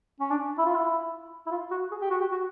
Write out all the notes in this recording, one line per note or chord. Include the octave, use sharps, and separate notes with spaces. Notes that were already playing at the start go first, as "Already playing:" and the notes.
C#4
D4
E4
F4
E4
E4
F4
F#4
G#4
G4
F#4
G4
F#4